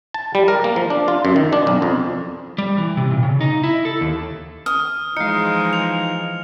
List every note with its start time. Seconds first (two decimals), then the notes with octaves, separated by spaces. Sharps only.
0.14 A5
0.35 G3
0.48 A#4
0.64 A#3
0.76 F3
0.90 D4
1.08 F4
1.25 F#2
1.36 D#3
1.53 D4
1.67 B1
1.82 F2
2.58 G3
2.78 E3
2.97 C3
3.11 A#2
3.23 C#3
3.41 D#4
3.64 E4
3.85 A4
4.01 D#2
4.66 D#6 F6
5.17 E3 F3 G#3 D#4 F5 C#7
5.73 F7